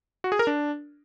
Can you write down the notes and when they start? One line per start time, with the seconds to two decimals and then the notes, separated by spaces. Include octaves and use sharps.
0.24 F#4
0.32 G#4
0.39 A#4
0.47 D4